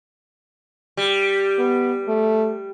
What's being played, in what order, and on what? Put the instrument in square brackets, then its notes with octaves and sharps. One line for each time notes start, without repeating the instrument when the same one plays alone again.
[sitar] G3
[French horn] B3
A3